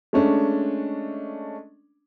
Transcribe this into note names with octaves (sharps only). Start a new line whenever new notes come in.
G#3 A3 C#4 D4